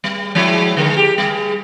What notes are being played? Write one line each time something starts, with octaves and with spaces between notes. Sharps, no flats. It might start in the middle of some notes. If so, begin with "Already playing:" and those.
G3
F3 G#3 E4
D3 G#3 A#4
G4
G3 G#4